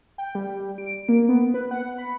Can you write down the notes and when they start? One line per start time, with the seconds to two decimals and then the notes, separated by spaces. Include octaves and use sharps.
0.18 G5
0.35 G3
0.78 D7
1.09 A#3
1.29 B3
1.54 B4
1.71 F#5
1.98 B5